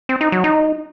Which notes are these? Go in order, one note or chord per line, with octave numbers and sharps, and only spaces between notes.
C4
D#4
F#3
D#4